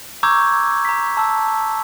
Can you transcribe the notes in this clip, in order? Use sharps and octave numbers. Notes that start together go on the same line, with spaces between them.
A#5 C#6 D6 E6 G6 G#6
A#5 B6
A5 E6